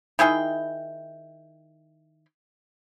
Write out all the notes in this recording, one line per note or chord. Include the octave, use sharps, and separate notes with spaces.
D#3 E4 G#4 G5